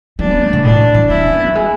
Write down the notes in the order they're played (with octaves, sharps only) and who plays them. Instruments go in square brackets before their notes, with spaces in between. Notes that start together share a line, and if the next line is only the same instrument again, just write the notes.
[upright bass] E3 [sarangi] D4
[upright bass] C#4
B3
A3
C#3
[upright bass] A2 [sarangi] D4
[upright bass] E3
[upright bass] D4 [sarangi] E4
[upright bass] C#4
B3
F#3
G#3